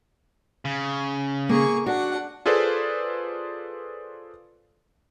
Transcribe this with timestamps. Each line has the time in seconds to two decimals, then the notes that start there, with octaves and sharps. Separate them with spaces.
0.65 C#3
1.49 A#3 G#4 C#6
1.86 D4 F#4 F#5
2.46 F4 G#4 A4 B4 C5 D5